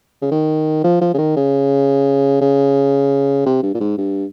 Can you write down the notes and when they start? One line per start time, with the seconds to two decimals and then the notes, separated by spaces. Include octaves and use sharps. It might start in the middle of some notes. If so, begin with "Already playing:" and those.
0.22 C#3
0.31 D#3
0.84 F3
1.01 F3
1.14 C#3
1.18 D#3
1.36 C#3
2.41 C#3
3.46 C3
3.63 G2
3.75 A#2
3.80 G#2
3.98 G2